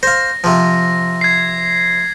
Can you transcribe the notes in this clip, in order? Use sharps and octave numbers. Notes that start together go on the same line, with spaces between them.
C5 F5 A#6
C3 F3
G#6 C7